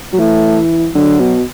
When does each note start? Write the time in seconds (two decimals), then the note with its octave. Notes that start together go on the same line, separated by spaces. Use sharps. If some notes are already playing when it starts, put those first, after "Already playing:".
0.13 F#3
0.18 E3 A3
0.95 D3 F#3
1.19 B2